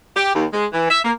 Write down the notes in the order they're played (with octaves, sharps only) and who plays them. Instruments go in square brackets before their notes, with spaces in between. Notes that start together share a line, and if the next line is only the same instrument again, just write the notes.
[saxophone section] G4
D#2
G#3
E3
E5
A#3